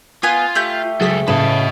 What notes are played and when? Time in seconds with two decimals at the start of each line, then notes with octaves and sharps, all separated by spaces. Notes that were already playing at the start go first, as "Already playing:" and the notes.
0.23 B3 F4 G#5 C6 D#7
0.55 A3 G4 G6
1.01 C#2 F#3 G#4 A4 B6
1.28 A2 C#3 B4 D#5 A5